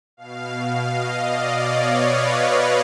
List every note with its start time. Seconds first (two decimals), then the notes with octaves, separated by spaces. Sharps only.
0.17 B2 F5
0.53 F5
0.88 D#5
1.24 D5
1.60 C#5
1.94 B4